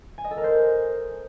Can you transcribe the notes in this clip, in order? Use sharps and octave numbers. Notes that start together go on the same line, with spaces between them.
G#5
D#5
A4
A#4
C5